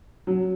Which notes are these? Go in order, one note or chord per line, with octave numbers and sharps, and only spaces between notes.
F#3